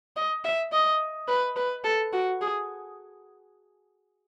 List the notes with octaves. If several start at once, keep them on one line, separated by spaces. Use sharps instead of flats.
D#5
E5
D#5
B4
B4
A4
F#4
G#4